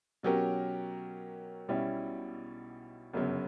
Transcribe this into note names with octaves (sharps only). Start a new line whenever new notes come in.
B2 F#3 C#4 G4 A#4
B1 B2 G3 C#4 E4
G1 F#2 C#3 F#3